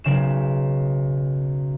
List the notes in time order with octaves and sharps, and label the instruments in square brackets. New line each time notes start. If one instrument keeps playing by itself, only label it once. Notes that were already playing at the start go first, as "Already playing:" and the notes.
[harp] B1 C#3 E7